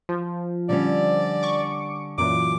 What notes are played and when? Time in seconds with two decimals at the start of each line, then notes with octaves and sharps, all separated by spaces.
0.09 F3
0.69 D3 G3 C#4 D5
1.43 C#6 D6
2.18 F#2 A#2 E3 D6